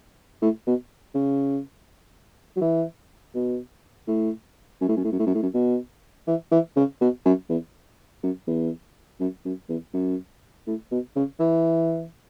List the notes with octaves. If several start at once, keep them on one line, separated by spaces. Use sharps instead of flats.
A2
B2
C#3
F#3
E3
B2
A2
F#2
A2
F#2
A2
F#2
A2
F#2
A2
F#2
B2
E3
E3
C#3
B2
F#2
E2
F#2
E2
F#2
F#2
E2
F#2
A2
B2
C#3
E3